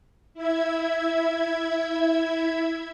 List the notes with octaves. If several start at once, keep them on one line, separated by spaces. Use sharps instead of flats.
E4 E5 G#6